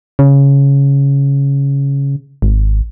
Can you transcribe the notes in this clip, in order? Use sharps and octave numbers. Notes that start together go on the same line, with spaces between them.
C#3
G#1